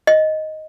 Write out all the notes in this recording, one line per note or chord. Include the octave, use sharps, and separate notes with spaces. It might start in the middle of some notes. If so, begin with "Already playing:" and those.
D#5